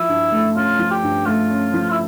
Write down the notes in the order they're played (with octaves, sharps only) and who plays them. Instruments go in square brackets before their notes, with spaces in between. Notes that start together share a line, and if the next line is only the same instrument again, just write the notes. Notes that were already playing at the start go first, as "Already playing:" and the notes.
Already playing: [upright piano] F3 [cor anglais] E4
[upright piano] G2
A3
[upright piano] C#4 [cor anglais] F4
[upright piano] F3
[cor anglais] G4
[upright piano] G2
[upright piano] A3 [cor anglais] F4
[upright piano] C#4
F3
[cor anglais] E4